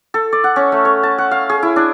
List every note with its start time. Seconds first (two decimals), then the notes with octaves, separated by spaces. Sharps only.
0.14 A4
0.33 D5
0.44 F#5
0.56 C#4
0.72 A3
0.85 C#5
1.03 A5
1.18 F#5
1.31 F5
1.50 G#4
1.63 E4
1.76 D4